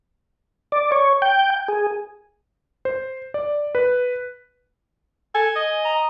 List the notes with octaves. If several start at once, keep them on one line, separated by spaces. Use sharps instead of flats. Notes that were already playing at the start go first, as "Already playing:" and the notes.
D5
C#5
G5
G#4
C5
D5
B4
A4 G#5
D#5
A#5